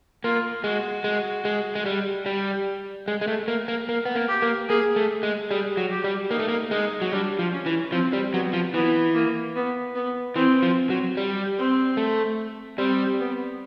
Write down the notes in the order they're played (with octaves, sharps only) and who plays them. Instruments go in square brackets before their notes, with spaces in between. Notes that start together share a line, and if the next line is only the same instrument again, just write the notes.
[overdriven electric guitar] A#3 [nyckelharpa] F4
[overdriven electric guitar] G#3 [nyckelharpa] F#4
[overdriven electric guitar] G#3
G#3
G#3
G3
G3
G#3
G#3
A3
A#3
A#3
A#3
B3
A#3
[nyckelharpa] G4
[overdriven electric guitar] A#3
[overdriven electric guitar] A#3 [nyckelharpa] G#4
[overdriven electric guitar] A3
G#3
[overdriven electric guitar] G3 [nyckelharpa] G#4
[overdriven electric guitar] F#3
[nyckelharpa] G4
[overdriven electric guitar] G3
[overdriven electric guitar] A#3 [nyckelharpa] D#4
[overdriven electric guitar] A3
A#3
[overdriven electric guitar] G#3 [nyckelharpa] D#4
[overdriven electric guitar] F#3
[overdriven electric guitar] G3 [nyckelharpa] D4
[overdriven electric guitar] F3
[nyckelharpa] C#4
[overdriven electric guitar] E3
[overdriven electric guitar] F3 [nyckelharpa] C4
[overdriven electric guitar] G3
[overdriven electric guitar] F#3 [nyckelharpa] B3
[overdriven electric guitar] F3
[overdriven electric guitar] E3 [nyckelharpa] B3
[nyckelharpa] A#3
B3
B3
[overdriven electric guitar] E3 [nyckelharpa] C4
[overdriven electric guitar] F3
F#3
G3
[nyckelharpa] C4
[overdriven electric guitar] A3
[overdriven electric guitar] G3 [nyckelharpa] C4
[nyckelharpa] B3